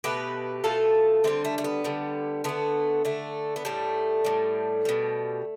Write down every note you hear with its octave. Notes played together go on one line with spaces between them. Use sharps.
B2 A3 G4 B4
B2 A3 F4 A4
D3 G3 A3 C4
A3
A3
B3
D3 G3
D3 A3 B3
D3 A3
B3
A2 G3 A3
A2 G3
B2 G3